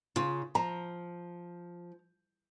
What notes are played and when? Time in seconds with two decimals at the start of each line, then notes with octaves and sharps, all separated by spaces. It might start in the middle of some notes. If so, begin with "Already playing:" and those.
0.16 C#3 F4
0.55 F3 A#5